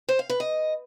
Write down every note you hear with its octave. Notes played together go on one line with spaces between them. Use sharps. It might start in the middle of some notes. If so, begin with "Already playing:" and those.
C5
F5
B4
D#5